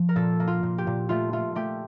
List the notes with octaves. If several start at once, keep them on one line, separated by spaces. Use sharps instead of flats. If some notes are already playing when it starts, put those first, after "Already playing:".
Already playing: F3
A#4
A#2 A4
A#3
F4
A#2
G4
A#2
A3 F4
A3 F4
A3 G4